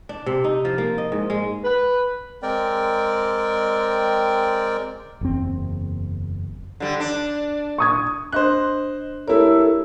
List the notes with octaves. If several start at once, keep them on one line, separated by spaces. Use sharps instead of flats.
D4
C3
D#4
F3
A#3
D#5
G#2
G#3
B4
G#3 C4 A#4 D5 G5
F#1 E2 C4
D3 G3
D4
C#6 D#6 G#6
D4 C5 D#5 F#6
A3 E4 G4 A4 A#4 C#5